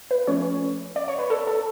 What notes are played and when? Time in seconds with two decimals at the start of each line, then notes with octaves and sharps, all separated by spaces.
0.11 B4
0.27 F3 A3 C#4 C#5
0.96 D5
1.08 C#5
1.19 B4
1.30 A4
1.47 A4